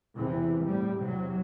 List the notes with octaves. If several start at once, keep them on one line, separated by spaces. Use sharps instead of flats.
E2 C3 E3
A2 G3
E2 C3 F#3